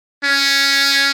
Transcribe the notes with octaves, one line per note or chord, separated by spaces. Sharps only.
C#4